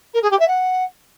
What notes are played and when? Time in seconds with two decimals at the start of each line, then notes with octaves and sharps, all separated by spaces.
0.14 A#4
0.22 G#4
0.30 G4
0.39 E5
0.47 F#5